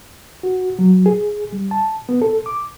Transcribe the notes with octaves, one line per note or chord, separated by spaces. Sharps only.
F#4
F#3
G#4
G3
A5
B3
A4
D6